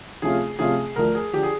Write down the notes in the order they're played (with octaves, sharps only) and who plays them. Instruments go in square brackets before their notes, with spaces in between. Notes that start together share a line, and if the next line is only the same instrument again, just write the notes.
[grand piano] C3 F3 A3 C#4 F4 [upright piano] G#4
[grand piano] C3 F3 A3 C#4 F4 [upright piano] G#4
[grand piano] D2 D3 F3 [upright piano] A#4
[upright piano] G#4
[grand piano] D3 F3 [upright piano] G4
[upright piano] G#4